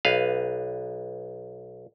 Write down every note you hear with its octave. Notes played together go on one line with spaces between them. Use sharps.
B1 B4 F5